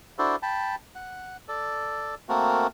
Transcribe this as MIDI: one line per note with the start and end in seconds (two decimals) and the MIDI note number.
0.19 0.36 62
0.19 0.36 64
0.19 0.36 66
0.19 0.36 69
0.19 0.36 72
0.19 0.36 74
0.42 0.75 79
0.42 0.75 81
0.42 0.75 83
0.95 1.37 78
1.48 2.15 69
1.48 2.15 74
2.29 2.67 57
2.29 2.67 58
2.29 2.67 60
2.29 2.67 66
2.29 2.67 70